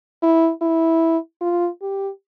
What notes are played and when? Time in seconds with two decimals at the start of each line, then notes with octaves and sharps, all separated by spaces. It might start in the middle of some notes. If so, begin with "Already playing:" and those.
0.23 E4
0.62 E4
1.41 F4
1.82 G4